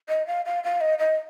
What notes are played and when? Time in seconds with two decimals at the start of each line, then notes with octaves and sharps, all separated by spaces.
0.09 D#5
0.27 F5
0.45 F5
0.64 F5
0.81 D#5
0.99 D#5